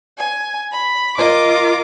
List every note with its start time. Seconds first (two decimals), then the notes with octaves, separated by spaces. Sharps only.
0.18 G#5
0.72 B5
1.18 F4 A#4 D#5 D6